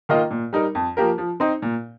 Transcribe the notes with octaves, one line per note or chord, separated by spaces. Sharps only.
D#3 A#3 F4 D#5
A#2
G3 D#4 A#4
F2
F3 A#3 G4 A#4
F3
C4 D#4 C5
A#2